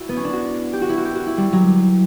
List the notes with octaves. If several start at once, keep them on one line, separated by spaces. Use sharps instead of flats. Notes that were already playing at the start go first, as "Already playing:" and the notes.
Already playing: E4 F#4
B3
C#4
D4
F#4
G4
F#4
E4
F#4
G4
F#4
E4
G3
F#3